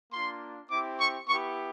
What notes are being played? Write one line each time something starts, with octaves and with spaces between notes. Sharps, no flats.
A#3 D4 F4 C6
C4 E4 G4 D6
C#6
B3 E4 G4 C#6